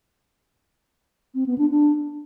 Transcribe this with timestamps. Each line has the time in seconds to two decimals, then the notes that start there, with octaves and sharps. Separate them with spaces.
1.34 C4
1.46 B3
1.58 D4
1.70 D4